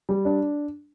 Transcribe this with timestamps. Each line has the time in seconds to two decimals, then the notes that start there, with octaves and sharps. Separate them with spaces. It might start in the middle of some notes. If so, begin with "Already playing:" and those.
0.09 G3
0.25 D4